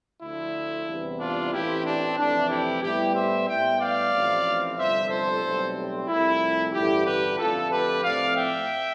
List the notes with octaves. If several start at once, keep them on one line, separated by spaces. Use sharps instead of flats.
D2 D3 F3 E4
E2 C3 G3 B3
D4 F4
A1 A2 E3 A3 C4 E4 G4
D4
F2 C3 E3 A3 D4
E4 G4
A2 G3 B3 E4 G4
C5 E5
A2 G3 B3 E5 G5
D5 F5
A1 A2 F3 C4
G1 F2 C3 G3 C5 E5
A4 C5
B1 A2 G3 C4
C2 C3 F3 A3 E4
A1 G2 D3 A3 E4 G4
G4 B4
F2 D3 A3 F4 A4
G4 B4
A2 F3 A3 C4 D5 F5
E5 G5